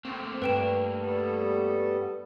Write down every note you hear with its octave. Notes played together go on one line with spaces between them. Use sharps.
A3 A#3 C4
G2 B4 G5 E7
G3 B3 A4